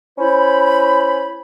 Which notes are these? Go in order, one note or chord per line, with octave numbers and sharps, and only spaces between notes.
C#4 E4 C5 B5